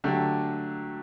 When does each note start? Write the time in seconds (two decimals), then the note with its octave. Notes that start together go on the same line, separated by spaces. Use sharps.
0.04 D3 F#3 A3 D4 G4